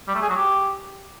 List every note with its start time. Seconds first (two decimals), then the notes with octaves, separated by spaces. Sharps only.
0.08 G3
0.15 A3
0.22 G#4
0.29 F#3
0.36 G4